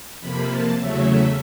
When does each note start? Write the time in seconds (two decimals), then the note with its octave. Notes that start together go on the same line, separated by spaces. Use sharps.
0.20 F2 C3 F3 A#3 B5
0.49 A5
0.77 E2 C#3 F#3 A3 C#4 E5
1.06 E5